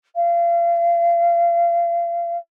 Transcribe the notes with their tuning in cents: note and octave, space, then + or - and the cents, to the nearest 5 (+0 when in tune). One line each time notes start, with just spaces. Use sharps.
F5 -35